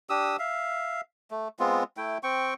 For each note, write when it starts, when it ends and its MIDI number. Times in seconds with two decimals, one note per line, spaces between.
0.10 0.37 62
0.10 0.37 67
0.10 0.37 87
0.10 0.37 88
0.39 1.01 76
0.39 1.01 77
1.31 1.48 57
1.59 1.84 56
1.59 1.84 59
1.59 1.84 60
1.59 1.84 65
1.97 2.18 57
1.97 2.18 64
1.97 2.18 79
2.23 2.54 60
2.23 2.54 79
2.23 2.54 85